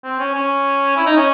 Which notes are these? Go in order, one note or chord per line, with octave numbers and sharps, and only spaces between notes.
C4
C#4
C#4
E4
D#4
C#4